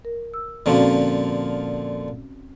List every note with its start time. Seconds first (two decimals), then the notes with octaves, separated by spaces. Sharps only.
0.05 A#4
0.34 E6
0.66 A#2 D3 F3 C4 C#4 F#4